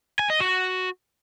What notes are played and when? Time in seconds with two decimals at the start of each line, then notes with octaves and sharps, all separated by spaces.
0.19 G#5
0.30 D#5
0.40 F#4